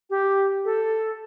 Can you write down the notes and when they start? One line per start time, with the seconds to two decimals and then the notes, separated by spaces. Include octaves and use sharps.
0.10 G4
0.65 A4